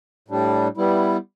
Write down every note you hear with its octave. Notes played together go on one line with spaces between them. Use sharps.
A2 G3 D4
G3 B3 E4